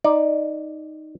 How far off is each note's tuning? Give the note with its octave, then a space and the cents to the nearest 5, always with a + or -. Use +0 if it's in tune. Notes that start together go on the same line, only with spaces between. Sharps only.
D#4 +0 D5 +10